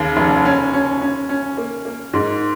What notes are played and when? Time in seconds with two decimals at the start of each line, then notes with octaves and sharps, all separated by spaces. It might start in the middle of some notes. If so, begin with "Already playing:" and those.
Already playing: D#2 C#3
0.17 F1
0.45 C#4
0.73 C#4
1.01 C#4
1.29 C#4
1.57 A#3
1.85 A#3
2.14 G#2